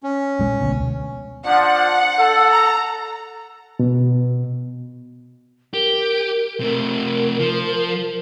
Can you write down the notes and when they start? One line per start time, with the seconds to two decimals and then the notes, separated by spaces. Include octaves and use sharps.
0.03 C#4
0.39 A#1 G#3
0.60 D2 B2
1.46 F3 D4 F#5
2.18 A4
2.51 A#5
3.79 B2
5.74 G4 A#4
6.60 C3 A3 A#4
7.39 F3